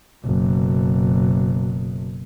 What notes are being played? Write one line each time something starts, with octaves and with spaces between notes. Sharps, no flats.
F#1 B2